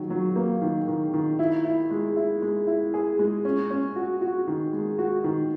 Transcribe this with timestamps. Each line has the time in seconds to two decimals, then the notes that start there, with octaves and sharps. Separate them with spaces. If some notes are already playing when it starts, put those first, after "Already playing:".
Already playing: D#3 F#3
0.10 F#3
0.36 A#3
0.62 D#3
0.88 D#3
1.14 D#3
1.39 E4
1.65 E4
1.91 G#3
2.16 E4
2.42 G#3
2.67 E4
2.94 G#4
3.19 G#3
3.45 C#4
3.70 C#4
3.96 F#4
4.21 F#4
4.47 D#3
4.73 G#3
4.98 F#4
5.24 D#3